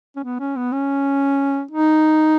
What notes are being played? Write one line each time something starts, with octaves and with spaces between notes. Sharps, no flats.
C#4
B3
C#4
B3
C#4
D#4